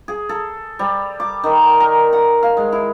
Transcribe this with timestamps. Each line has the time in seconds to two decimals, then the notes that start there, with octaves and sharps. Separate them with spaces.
0.08 G#4
0.29 A4
0.79 G3
1.20 D6
1.44 D#3
1.80 A#4
2.13 F#5
2.43 F5
2.57 G#3
2.72 E4